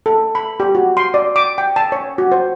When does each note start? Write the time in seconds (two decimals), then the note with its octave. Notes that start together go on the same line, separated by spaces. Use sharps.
0.06 A4
0.35 B5
0.60 G4
0.75 F#4
0.97 C6
1.14 D5
1.36 D6
1.58 G5
1.76 A5
1.92 C#5
2.18 F#4
2.32 C5